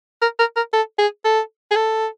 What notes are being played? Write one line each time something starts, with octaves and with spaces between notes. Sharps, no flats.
A#4
A#4
A#4
A4
G#4
A4
G#4
A4